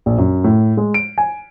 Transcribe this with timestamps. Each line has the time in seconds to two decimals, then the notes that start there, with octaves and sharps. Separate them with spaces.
0.06 A#1
0.18 F#2
0.44 A2
0.77 G#3
0.94 D7
1.18 G#5